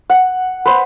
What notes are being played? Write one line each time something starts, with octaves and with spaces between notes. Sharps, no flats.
F#5
B4 C5